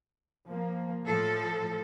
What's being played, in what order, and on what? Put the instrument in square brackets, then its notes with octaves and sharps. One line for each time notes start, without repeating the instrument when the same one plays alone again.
[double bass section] F3 A#3
[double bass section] A2 [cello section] F3 A4